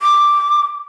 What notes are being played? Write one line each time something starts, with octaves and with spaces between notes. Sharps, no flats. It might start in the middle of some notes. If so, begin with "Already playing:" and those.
D6